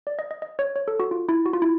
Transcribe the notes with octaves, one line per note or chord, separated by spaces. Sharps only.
D5
D#5
D#5
D#5
C#5
C#5
A4
F#4
F4
E4
F#4
F4
E4